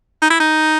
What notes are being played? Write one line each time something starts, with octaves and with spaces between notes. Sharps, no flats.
D#4
E4
D#4